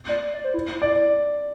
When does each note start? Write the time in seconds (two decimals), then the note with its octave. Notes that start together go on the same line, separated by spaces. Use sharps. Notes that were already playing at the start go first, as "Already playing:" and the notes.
0.09 D5
0.34 D5
0.44 C5
0.54 E4
0.82 D5